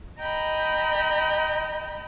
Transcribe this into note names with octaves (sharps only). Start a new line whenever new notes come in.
D#5 G5 A#5 B5